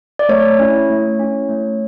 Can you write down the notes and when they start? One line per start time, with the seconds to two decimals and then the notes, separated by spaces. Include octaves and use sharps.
0.19 D5
0.29 A3 C#5
0.59 C#4 E4
0.90 A3
1.20 C#4 E4
1.49 A3